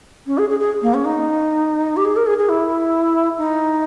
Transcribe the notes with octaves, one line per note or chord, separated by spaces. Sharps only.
C#4
G#4
G#4
G#4
A#3
C#4
D#4
G4
G#4
A#4
G#4
G#4
E4
D#4